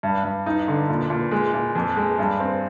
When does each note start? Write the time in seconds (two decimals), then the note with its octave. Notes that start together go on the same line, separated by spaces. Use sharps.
0.03 G2
0.24 G2
0.46 D#4
0.68 D3
0.90 A#2
1.10 A#2
1.31 G#3
1.54 A#2
1.75 F2
1.97 G#3
2.19 G2
2.40 C4